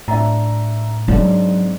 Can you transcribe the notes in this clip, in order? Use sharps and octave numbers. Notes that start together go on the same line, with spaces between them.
A2 D4 E5 A#5
G#2 F#3 C4 D4